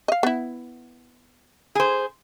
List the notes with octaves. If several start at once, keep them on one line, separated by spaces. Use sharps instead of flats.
D#5 F5
B3 E4
G#4 C5